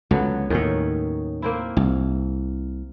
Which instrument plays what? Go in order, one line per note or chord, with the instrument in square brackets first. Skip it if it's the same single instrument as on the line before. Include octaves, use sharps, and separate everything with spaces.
[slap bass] C#2 [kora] D3 F#3 B3
[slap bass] D#2 A2 [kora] D#3 C#4 C#5
[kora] A#3 C4 E4
[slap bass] C2